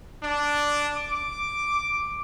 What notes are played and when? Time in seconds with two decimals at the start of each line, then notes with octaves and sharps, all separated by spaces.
0.22 D4
0.95 D6